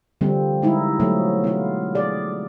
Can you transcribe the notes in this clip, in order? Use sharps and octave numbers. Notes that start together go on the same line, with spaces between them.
D3 F3 G3 C4
G#3 D#4 E4
F3 F#3 A3 B3
B3 F4
G#4 D5